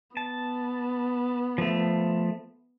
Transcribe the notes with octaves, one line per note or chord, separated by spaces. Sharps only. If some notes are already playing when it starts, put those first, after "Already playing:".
B3 A5
F3 A3